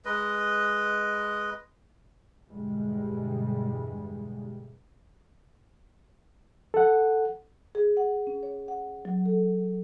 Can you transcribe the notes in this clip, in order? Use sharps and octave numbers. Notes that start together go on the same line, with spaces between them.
G#3 B4 D#5
E2 G2 B2 D3 G3 G#3
A4 F#5
G#4
F#5
C#4
C#5
F#5
F#3
A4